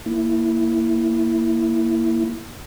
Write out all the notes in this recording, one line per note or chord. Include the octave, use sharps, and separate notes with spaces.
A#3 E4